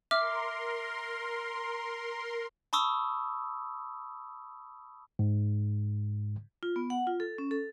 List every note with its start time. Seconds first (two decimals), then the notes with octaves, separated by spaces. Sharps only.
0.11 A#4 E5 C6 D6 F6
2.73 A5 B5 C#6 D#6 E6
5.19 G#2
6.63 F4
6.76 B3
6.90 F#5
7.07 F4
7.20 A4
7.38 C#4
7.51 A4